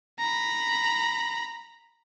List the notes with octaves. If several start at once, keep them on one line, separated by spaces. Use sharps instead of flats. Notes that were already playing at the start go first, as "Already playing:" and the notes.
A#5 B5